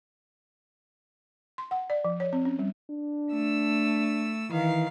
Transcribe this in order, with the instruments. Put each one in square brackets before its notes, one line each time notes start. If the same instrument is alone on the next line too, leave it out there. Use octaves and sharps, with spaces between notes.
[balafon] C6
F#5
D5
F3
C#5
C4
C#4
G3
[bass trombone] D4
[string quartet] A3 E6
[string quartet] D#3 F5 [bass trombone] E3